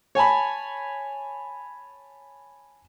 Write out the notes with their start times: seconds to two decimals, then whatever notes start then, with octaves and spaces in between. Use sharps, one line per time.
0.15 C#5 G#5 A5 B5